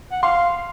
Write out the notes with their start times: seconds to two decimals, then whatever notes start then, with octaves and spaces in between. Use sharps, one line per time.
0.12 F#5
0.23 F5 C6